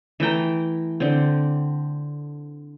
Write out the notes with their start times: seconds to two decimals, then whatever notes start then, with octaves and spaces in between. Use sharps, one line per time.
0.20 E3 A3 G5 A#5
1.00 D3 C4